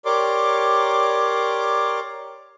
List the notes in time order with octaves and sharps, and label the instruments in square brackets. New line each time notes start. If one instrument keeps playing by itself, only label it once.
[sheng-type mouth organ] G4 A#4 C#5 D5 C6 D6